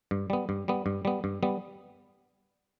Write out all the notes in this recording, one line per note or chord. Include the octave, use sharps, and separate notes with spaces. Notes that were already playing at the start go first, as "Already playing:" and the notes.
G2
G3 B3
G2
G3 B3
G2
G3 B3
G2
G3 B3